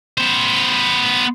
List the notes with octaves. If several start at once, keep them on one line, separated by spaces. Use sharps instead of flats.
B3 C5